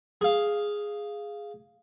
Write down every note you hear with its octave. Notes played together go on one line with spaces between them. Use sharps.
G#4 F5